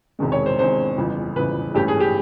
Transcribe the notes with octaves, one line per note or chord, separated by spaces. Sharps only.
E1 E2 C3 D#3 G#3
C#5
C5
E1 E2 C3 D#3 G#3 C5
G1 F2 C#3 E3
G1 F2 C#3 E3 B4
G#1 G2 E3 A3 C#4 G4
G#4
G4